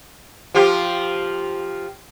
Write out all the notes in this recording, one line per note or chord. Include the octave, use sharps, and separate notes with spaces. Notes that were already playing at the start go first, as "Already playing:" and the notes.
F3 F4 G4